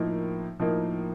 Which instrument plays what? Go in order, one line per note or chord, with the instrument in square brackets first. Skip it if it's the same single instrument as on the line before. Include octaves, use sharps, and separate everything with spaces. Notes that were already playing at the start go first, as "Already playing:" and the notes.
Already playing: [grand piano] A2 F3 A#3 D#4 A#4
A2 F3 A#3 D#4 A#4